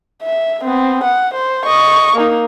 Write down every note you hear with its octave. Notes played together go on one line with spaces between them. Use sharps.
E5
B3 C4
F#5
C5
D#5 C#6
A#3 D#4